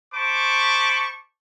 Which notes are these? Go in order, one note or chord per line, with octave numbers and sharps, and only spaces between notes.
C5 A5 B5 C#6 D6